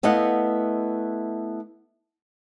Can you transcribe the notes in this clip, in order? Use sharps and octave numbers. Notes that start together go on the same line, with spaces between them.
A3 B3 E4 D#5 F5 F#5